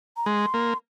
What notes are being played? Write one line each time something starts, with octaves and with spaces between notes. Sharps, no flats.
A#5
G#3 C6
A#3